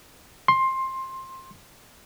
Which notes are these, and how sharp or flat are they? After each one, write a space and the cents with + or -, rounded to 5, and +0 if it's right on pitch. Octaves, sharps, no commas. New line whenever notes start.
C6 +15